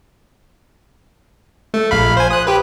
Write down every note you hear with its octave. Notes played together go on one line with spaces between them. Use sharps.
A3
A#1 F5 B5
C5 G#5
D#6 F#6
G4 B4